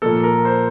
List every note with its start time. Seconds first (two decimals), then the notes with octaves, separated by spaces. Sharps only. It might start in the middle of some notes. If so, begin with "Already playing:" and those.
0.02 A#2 F3 A#3 A4
0.23 A#4
0.45 C5